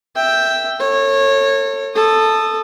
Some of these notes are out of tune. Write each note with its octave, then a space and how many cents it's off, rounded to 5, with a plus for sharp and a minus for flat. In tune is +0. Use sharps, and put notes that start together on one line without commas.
E5 +0 G5 +0
A4 +40 C#5 -20
A4 +0 D#6 -20